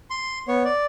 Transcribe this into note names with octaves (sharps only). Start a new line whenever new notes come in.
C6
B3 C#5
D5